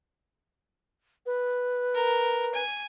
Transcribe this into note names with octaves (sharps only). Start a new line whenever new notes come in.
B4
A#4
G#5